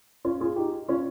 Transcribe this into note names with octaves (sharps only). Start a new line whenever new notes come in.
C#4 F4
F4 G#4
D#4 G4
C#4 F4